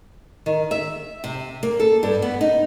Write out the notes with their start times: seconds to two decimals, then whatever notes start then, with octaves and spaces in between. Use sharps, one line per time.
0.46 D#3
0.71 E5
1.24 C3
1.63 A#3
1.80 A4
2.03 G2
2.22 B3
2.41 D#4